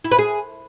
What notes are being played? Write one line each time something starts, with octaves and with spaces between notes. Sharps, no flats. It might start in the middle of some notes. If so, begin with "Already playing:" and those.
E4
B4
G#4